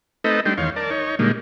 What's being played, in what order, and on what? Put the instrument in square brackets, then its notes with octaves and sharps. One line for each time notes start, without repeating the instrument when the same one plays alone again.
[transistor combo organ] A3 C4 D#4 A4 B4 D#5
G3 A3 D4 D#4 G5 C6
E2 D#3 C#5 F5 C6
A#4 D5 A5
D#4 C#5
A#2 D3 G3 G#3 A#3 D#4